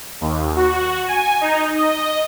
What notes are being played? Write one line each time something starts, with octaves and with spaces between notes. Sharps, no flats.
D#2
F#4
G#5
D#4
D#5